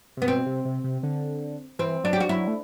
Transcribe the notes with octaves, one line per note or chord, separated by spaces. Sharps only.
C3 B3
B2 C4
C3
C3
C3
D3
E3 C4
F#3 D4
G4
F#4
F#3 E4
A3